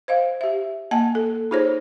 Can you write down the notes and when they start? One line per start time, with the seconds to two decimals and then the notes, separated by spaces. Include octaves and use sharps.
0.08 C5 D#5 F5
0.41 G4 E5
0.91 A#3 D#5 F#5 G#5 A5
1.15 A4
1.51 D#4 F4 G#4 C5 C#5